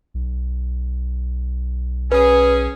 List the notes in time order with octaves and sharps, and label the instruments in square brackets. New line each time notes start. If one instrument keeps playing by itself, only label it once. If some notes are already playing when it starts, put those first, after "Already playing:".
[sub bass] B1
[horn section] C#4 G#4 [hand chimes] B4